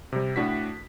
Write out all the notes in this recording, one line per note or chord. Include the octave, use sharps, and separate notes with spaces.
C3 G3
A2 D4 F#4 B6